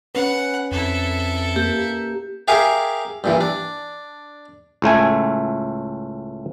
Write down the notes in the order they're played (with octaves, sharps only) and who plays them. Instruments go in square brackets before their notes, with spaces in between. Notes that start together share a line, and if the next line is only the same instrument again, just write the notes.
[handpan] C#4 B4 [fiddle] F#5
[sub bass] F2 [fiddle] E4 A4
[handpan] A#3 [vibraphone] G4
[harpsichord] G4 G#4 A#4 E5 F5 G#5
G2 A#2 E3
D4
[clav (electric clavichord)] C#2 A2 A3 G#5